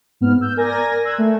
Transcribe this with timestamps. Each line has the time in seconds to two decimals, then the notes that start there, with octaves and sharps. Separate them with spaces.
0.21 G#2 B3 F6
0.41 E6 G6
0.57 A#4 D5 G#5 G#6 A#6
1.04 C6 E6 F#6 G#6
1.18 A3